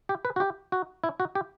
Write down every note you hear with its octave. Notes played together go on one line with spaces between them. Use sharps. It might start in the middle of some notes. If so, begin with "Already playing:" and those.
G4
B4
F#4
G4
F#4
E4
F#4
G4